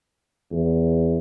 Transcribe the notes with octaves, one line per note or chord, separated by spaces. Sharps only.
E2